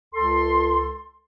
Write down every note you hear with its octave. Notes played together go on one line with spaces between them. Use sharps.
C#2 A4 C6